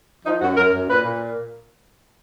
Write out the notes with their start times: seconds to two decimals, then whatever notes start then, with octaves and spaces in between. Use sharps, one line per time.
0.25 F3 D#4
0.41 F#2 F#4
0.57 F#2 A#4
0.73 F#2
0.89 A#2 B4
1.05 A#2